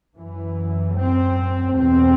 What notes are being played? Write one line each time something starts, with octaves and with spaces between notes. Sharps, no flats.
F#2 E3
C4
E2 B2 C4